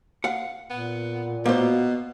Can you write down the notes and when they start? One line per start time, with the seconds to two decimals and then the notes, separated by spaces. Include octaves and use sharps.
0.24 F5 F#5
0.70 A#2 B3
1.46 B2 A#3 B3 F#4 C5